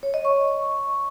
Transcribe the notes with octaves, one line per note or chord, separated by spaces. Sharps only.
C#5
D#5
C#6